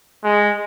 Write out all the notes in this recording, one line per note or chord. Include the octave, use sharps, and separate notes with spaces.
G#3